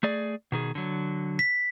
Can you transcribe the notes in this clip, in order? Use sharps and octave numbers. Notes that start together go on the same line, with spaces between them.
A3 G#4 D5
B2 D#3 G#4
D3 F#3
B6